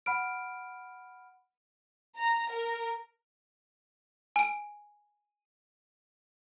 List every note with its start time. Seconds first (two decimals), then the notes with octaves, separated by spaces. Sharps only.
0.06 F#5 B5 F6 D7
2.19 A#5
2.52 A#4
4.36 G#5 D7